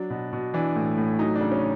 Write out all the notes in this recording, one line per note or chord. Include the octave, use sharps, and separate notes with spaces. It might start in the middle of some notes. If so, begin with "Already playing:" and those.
Already playing: F#3 D4
B2
B2
E3 D4
A2
A2
F#3 D#4
D4
C#3
C#4